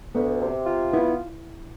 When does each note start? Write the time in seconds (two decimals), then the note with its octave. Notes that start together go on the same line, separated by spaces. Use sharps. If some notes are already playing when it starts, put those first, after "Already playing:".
0.14 D2 B3
0.41 C3
0.67 F4
0.92 B3 E4